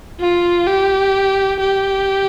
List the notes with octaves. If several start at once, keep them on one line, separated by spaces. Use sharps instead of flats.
F4
G4
G4